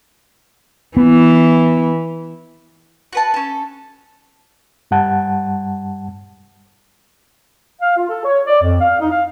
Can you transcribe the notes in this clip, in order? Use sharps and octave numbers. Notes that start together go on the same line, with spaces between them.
E3 B3
F#4 B4 A5
C#4 A4
G2 G3 F#5 A5
F5
F4
A4
C#5
D5
F2
F5
D#4
F5